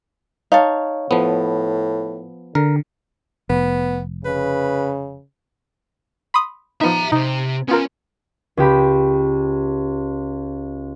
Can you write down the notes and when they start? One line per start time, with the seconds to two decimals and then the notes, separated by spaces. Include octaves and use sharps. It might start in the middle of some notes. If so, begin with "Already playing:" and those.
0.52 D#4 C#5 F5 A5
1.11 A2 F3 B3
2.55 D3 A#4
3.50 F1 B3
4.25 C#3 B4
6.34 B5 C6 D#6
6.81 F3 B3 D#4 E5 A#5
7.12 C3 D#4
7.69 B3 C#4 F4 A#4 C6
8.57 C#2 G4 B5